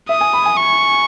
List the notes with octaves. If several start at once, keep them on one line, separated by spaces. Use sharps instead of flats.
E5 D#6
G#5
B5
G#5
C#6